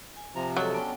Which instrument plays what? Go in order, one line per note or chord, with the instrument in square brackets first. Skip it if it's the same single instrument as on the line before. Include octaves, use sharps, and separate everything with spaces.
[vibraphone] G#5
[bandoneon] C3 F3 [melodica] A#5
[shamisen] F#3 [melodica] G#3 [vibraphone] F4 A4
[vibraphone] B3 F#5 G5 [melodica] C#4 D4